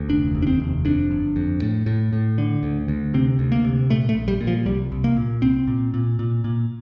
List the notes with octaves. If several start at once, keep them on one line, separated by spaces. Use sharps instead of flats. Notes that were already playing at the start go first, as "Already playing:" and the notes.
Already playing: D2
F1 D4
D#2
D4
C4
F1
F2 D4
G1
F2
A2
A2
A2
D3
D2
D2
C3 C4
D2
A#3
C3
A#2 A3
A3
A#1
G3
A#2
F3
C2 G3
C2
A#3
A#2
C2 C4
A#2
A#2
A#2
A#2